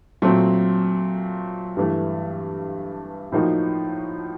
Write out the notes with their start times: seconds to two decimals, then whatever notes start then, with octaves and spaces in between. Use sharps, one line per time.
0.22 A#2 F#3 A3 C4
1.77 G2 E3 A3
3.32 A2 F3 A#3 D#4 F#4